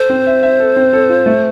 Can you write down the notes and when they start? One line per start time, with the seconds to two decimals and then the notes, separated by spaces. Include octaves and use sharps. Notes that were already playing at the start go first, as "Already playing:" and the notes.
Already playing: A4 C5
0.10 C4
0.27 E5
0.43 E5
0.60 A4
0.76 C4
0.93 A4
1.09 F4
1.26 A3